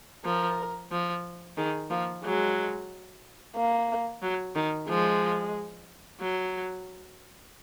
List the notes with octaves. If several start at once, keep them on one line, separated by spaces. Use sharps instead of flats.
F3 A#4
F3
D#3 G#4
F3 A#3
F#3 G#3
A#3
F#3
D#3
F3 G#3
F#3